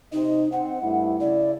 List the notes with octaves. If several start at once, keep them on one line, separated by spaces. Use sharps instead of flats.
C3 D#4 C5 D#5
C4 F#5
G2 A3 E4
C#3 E4 D5